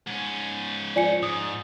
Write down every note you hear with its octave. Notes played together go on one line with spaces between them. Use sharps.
G#2 C#4
F3 D5 G#5 C#7
G#2 D#6